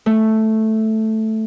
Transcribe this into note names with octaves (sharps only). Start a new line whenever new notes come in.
A3